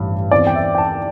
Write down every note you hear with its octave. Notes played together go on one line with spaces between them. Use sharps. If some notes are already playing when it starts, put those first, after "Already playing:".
Already playing: A1 G2 G3
E2 E3 C4 D5
G5
E5
G5
A5